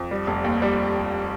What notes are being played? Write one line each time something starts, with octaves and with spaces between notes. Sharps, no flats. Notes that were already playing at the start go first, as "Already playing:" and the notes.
Already playing: F2
G3
F1
D#2
G3